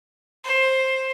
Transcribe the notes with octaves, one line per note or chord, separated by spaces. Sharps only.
C5